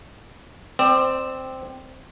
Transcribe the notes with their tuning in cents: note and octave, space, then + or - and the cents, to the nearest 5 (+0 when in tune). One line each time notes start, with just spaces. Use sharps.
C4 +0 D5 +30